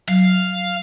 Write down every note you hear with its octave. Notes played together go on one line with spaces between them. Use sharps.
F#3 F5